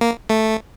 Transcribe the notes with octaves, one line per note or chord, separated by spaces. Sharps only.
A#3
A3